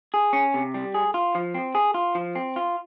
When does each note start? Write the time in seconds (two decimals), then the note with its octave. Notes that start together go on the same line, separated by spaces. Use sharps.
0.14 G#4
0.33 C#4
0.54 C3
0.74 G3
0.94 G#4
1.14 F4
1.35 F3
1.54 C4
1.75 G#4
1.94 F4
2.15 F3
2.35 C4
2.56 F4